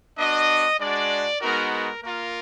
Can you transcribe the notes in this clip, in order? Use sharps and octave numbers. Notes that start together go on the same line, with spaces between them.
B3 D4 F#4 D#5
G#3 D4 F#4 D5
G#3 B3 D#4 F#4 A#4
A#4
A#3 F4 A#4